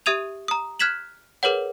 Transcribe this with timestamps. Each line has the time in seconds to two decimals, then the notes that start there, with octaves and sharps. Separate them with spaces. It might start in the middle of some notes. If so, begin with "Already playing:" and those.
0.06 G4 E5 D#6 G#6 D#7 F7
0.48 A#5 D#6
0.79 F6 F#6 G#6 B6 E7 F#7
1.43 G#4 A#4 B4 C#5 F#5